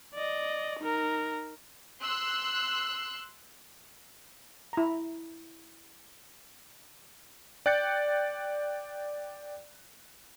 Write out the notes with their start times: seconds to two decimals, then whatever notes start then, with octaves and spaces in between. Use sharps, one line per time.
0.14 D5 D#5
0.80 D#4 A#4
2.01 C6 E6 F#6
4.73 E4 A#5
7.66 D5 G5 F#6 G6 A6 C#7